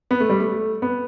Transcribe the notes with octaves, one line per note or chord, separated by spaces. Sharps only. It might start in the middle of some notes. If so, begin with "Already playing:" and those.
B3
A3
G3
A3
B3